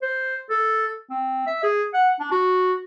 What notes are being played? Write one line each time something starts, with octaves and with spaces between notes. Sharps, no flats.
C5
A4
C4
E5
G#4
F#5
D4
F#4